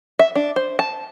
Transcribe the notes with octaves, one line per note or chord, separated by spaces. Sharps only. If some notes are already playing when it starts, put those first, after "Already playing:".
E5
D4
C5
A5